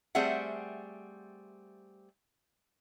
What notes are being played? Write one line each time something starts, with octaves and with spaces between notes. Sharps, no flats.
G3 A3 C4 G#4 E5 F#5